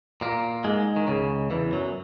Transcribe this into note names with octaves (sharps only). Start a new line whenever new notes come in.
A#2 A#3
G#2 G#3
D#3
C#2 C#3
E2 E3
F#2 F#3